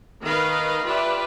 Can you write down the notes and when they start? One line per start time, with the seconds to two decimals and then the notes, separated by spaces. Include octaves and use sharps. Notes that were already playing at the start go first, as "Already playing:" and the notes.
0.24 D#3 A#4 B4 D#5 F5 B5
0.86 F4 G4 B4 D5 E5